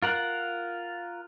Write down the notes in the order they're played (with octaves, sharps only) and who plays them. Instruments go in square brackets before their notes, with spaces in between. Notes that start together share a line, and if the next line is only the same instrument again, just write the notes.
[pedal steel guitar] F4 A#4 F#5